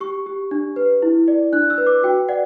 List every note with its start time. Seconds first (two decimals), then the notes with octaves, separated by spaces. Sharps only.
0.01 G4 C#6
0.26 G4
0.51 D4
0.76 B4
1.02 E4
1.28 D5
1.53 D4 F#6
1.70 E6
1.78 B4
1.87 D6
2.03 F#4 G5
2.29 D5 F#5